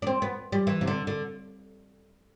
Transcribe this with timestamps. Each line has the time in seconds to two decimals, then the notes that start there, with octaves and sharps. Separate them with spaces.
0.02 D4
0.07 C4
0.22 B3
0.52 G3
0.67 E3
0.81 C3
0.87 D3
1.07 D3